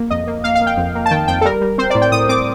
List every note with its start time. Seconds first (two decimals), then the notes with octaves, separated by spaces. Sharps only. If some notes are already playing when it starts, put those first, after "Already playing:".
Already playing: A#3
0.10 F2 D#5
0.27 A#3
0.44 A#3 F5
0.55 F5
0.61 A#3
0.67 G5
0.77 F2
0.95 A#3
1.06 A5
1.11 D#3 G5
1.28 F2 G5
1.41 A4
1.45 G3 A#4
1.61 G3
1.78 C4 C5
1.90 A2 D5
2.02 G5
2.12 A2 D#6
2.29 C4 D6